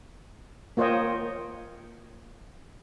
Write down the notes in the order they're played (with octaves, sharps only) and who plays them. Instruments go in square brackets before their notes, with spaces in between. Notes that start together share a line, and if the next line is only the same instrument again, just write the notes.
[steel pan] A#3 F4 C5 C#5 D#5 G5